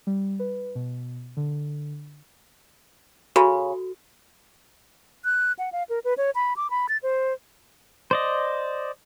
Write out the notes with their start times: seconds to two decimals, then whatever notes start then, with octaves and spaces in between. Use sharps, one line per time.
0.07 G3
0.39 B4
0.75 B2
1.37 D3
3.36 C#3 F#4 A4 B5
5.25 F#6
5.59 F#5
5.72 F5
5.89 A#4
6.04 B4
6.18 C#5
6.35 B5
6.56 D6
6.70 B5
6.89 A6
7.03 C5
8.11 C5 D5 D#5